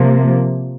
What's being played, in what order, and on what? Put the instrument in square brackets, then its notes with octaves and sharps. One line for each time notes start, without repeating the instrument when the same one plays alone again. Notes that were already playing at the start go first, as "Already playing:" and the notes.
Already playing: [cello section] C3 F3 A#3